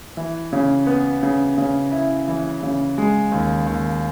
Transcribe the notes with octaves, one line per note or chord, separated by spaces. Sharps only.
E3
C#3
B3
C#3
C#3
E4
E3
C#3
G#3
D#2
D#2